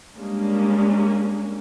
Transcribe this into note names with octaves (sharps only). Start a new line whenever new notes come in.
G3 G#3 A#3 C#4 D4